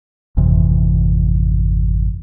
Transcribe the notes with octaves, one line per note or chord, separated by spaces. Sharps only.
G#1 F2 C3 E3